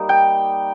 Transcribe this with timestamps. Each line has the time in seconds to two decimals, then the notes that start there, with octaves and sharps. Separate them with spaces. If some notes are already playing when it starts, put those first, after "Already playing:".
Already playing: G3 A#3 D#4
0.09 G5